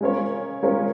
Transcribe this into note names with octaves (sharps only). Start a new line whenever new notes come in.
G#3 C#4 F4 A#4 C#5
G#3 C#4 F4 A#4 C#5